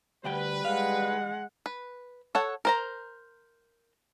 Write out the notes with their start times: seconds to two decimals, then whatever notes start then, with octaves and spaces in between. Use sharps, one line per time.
0.24 D2 G3 B4 F#5 G5
0.65 G#3 F5 F#5
1.66 B4
2.35 A4 C#5 F#5
2.65 A#4 C5 A#5